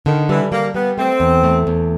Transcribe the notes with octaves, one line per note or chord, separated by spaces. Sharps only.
D3 D#3
E3 G3
G3 A#3
G3 B3
A3 C4
E2
A3
E2